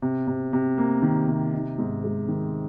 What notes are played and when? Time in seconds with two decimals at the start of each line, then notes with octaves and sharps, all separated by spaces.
0.02 C3
0.27 C3
0.53 C3
0.78 A#3
1.02 D#3
1.28 C3
1.53 D#4
1.78 G#2
2.04 G#3
2.28 D#3